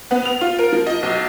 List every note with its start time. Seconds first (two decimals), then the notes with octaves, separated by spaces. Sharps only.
0.11 B3
0.25 F7
0.41 F4
0.59 A#4
0.72 F3
0.86 D#5
1.03 B1